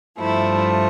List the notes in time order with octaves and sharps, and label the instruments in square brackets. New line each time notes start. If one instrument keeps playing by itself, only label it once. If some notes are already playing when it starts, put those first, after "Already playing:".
[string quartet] G2 F3 A3 E4